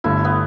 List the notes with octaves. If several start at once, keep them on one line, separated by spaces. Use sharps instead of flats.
G1 G2 D3 A3 E4
B3